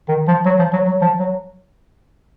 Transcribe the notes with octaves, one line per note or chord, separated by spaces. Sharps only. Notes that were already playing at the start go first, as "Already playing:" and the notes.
D#3
F3
F#3
F3
F#3
F#3
F3
F#3